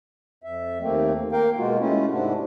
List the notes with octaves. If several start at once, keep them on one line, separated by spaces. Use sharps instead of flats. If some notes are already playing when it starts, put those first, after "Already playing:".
F2 E5
D#2 A3 A#3 C4
A#3 A#4 F5 G5
B2 G#3 A#3 F4 F#4
G#3 A3 C#4 E4 F4
G#2 C3 D4 E4 F#4